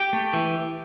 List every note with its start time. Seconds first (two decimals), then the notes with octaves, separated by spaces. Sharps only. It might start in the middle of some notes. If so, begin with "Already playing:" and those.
Already playing: G4 G5
0.13 A3
0.33 E3